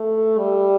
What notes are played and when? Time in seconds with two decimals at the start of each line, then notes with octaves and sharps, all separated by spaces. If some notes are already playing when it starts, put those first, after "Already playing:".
Already playing: A3
0.38 G3